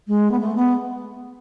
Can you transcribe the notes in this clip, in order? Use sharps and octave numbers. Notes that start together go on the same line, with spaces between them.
G#3
B3
A3
B3